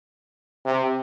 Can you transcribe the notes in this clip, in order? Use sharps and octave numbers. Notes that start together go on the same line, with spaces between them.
C3